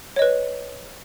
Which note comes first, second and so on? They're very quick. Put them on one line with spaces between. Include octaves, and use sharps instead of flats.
C#5 D#5 B4